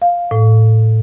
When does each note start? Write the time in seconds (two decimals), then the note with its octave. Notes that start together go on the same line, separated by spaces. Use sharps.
0.02 F5
0.31 A2